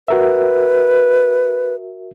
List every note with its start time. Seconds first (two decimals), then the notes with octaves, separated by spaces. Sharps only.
0.08 F#4 A#4 B4 E5